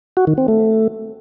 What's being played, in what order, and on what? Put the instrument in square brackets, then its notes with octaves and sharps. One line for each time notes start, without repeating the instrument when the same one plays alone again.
[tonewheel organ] F#4
D#3
C4
A3